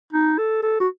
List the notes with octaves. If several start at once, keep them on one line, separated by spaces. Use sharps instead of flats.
D#4
A4
A4
F#4